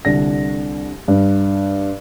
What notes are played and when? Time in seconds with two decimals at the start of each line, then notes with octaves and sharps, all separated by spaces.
0.05 C2 D3 A#6
1.08 G2